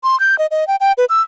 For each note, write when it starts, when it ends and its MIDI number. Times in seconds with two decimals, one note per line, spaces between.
0.04 0.18 84
0.20 0.38 91
0.39 0.46 75
0.51 0.67 75
0.68 0.76 79
0.81 0.92 79
0.98 1.05 71
1.09 1.21 88